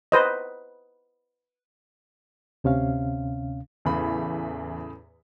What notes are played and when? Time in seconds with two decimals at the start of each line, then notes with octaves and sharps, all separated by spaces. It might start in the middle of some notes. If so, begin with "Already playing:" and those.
0.12 B4 C5 D#5
2.64 D2 C3 C#4 F5
3.85 E2 A2 C#3 B5